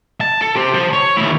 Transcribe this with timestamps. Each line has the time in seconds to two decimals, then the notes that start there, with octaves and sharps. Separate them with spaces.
0.21 A5
0.42 A4
0.56 G4 C5
0.74 C5 A5
0.93 C#5
1.17 D#2 E4